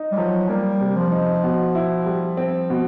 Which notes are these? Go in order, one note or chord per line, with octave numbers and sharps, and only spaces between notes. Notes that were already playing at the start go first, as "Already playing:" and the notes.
Already playing: D#4
G3
F3 F#3
G3 A#3
C3
F3
D#4
B2
E4
G3
C4
B2